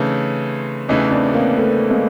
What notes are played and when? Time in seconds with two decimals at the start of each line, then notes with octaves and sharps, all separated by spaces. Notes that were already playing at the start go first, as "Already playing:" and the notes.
Already playing: C#3 E3 A3 C4 C#4 D#4
0.89 E2 C#3 E3 A3 C#4 D#4
1.11 C4 D4
1.34 A#3 C4
1.57 A3 B3
1.90 G#3 A#3